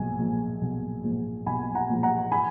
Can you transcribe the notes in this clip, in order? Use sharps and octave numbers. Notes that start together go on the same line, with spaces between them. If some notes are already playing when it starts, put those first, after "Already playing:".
Already playing: B1 A#2 F3 G#3 G#5
A#2 F3 G#3
B1
A#2 F3 G#3
B1 G#5 B5
F#5 A#5
A#2 F3 G#3
F#5 A#5
G#5 B5